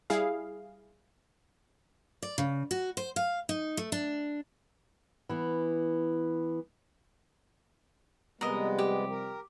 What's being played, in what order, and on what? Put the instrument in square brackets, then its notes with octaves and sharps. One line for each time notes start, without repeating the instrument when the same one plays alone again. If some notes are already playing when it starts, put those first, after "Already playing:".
[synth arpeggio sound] G3 E4 G#4 F5
[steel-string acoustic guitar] D5
C#3
F#4
C5
F5
D#4
A3
D4
E3 B3
[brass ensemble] C3 F3 G3 [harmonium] G#3 B3 [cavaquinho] A#4 D#5
[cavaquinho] G4
[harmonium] A#4